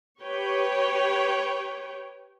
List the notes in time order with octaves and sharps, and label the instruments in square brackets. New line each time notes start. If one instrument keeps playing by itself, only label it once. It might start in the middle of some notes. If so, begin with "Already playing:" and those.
[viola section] G4 B4 C#5 G5